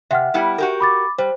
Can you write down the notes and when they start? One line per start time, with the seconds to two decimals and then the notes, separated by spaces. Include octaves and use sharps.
0.11 C3 E5 F#5 F6
0.34 G3 B3 E4
0.58 F#4 G4 A#4
0.80 B5 D6 A6
1.18 G3 C5